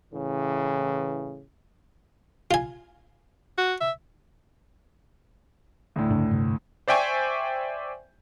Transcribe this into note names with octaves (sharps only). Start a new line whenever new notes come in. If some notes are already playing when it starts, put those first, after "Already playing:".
A2 C#3 E3
F4 G#5
F#4
E5
D2 A2
G2 C#3 D4
G2 C3
C5 D5 E5 G5 G#5 C#6